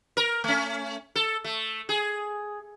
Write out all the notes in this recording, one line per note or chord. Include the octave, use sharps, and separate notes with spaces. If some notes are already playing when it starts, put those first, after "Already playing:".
A#4
A3 C#4
A4
A3
G#4